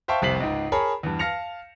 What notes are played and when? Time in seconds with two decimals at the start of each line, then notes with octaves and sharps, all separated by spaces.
0.08 C5 E5 F5 G5 A5 C#6
0.22 F1 C2 C3 B6 C7 F#7
0.40 C#2 G#2
0.72 G#4 A#4 C#5 A5 B5
1.03 E2 G2
1.19 F5 A5 F6 A#6 C#7 F7